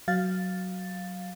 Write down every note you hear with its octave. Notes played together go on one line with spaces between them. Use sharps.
F#3 F5 A6